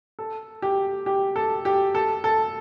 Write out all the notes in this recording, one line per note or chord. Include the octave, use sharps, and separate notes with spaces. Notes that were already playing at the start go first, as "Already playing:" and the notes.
A4
G4
G4
A4
G4
A4
A4